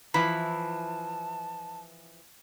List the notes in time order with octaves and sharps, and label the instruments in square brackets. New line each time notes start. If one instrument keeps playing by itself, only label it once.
[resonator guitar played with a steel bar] E3 F3 [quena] A5 [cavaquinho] B5